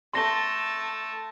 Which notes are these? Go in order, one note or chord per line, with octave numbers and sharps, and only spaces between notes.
A3 A5 C6 A#6 G7